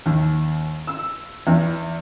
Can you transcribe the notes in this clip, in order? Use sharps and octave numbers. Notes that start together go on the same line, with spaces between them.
D#2
E6
E2